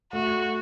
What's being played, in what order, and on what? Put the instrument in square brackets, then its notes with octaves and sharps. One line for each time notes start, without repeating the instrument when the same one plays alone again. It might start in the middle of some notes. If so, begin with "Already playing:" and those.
[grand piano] A3 [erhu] F#4